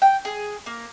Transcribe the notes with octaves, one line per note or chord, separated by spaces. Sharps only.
G5
G#4
A#3